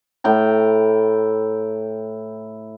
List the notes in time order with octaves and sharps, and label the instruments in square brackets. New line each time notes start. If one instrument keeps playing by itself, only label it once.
[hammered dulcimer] A2 G5 A#5